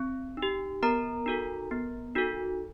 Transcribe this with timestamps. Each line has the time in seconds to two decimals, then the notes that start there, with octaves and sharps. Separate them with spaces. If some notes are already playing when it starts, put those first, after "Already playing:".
Already playing: C4
0.37 D#4
0.42 G4
0.83 B3 A#4 A#5
1.26 D#4 F#4 A4
1.71 B3
2.15 D#4 F#4 A4